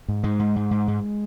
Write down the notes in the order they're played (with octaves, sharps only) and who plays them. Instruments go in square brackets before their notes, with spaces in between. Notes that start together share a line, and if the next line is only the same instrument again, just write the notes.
[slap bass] G#2
G#2 G#3
G#2
G#2
G#2
G#2